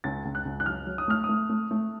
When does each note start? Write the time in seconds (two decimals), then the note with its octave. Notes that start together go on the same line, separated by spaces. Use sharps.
0.04 C#2 A6
0.25 C#2
0.35 F#6
0.45 C#2
0.60 F#6
0.66 F#3 F6
0.87 F#3
0.98 D#6
1.08 A3 F6
1.24 D#6
1.29 A3
1.49 A3
1.71 A3